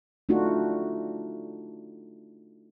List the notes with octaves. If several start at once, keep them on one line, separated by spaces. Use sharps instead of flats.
A3 D4 D#4 F4 F#4